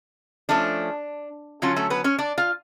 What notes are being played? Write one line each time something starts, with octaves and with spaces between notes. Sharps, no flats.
F3 A3 C#4 D4
D3 F#3 C#4 F4
A3 A4
B3 B4
C#4 C#5
D4 D5
F4 F5